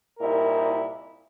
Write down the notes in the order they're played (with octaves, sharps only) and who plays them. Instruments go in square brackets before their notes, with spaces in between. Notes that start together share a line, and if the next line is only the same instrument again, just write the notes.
[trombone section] C2 A#2 D#4 E4 A#4